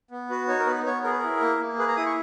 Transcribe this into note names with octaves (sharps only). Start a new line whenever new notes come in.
B3
F#4 B4
D#4 C#5
A#4
B3 B4
B3 C#5
G#4 A#4
B4
A#4
E4
A#3
A#3
G#4 B4
A#5
E4 D#6
C#6